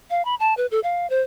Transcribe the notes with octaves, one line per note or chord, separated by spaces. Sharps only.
F5
B5
A5
B4
A4
F5
C5